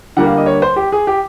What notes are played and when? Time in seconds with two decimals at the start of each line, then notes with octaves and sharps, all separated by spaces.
0.17 D3 G3 A#3 F#5
0.27 F5
0.37 D#5
0.46 C#5
0.62 C5
0.76 G4
0.92 G#4
1.07 G4